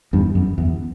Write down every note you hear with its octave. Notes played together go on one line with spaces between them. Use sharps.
E2 G2
F#2
E2